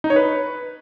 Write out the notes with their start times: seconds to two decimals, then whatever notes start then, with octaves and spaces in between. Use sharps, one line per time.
0.04 D#4
0.10 C#5
0.16 B4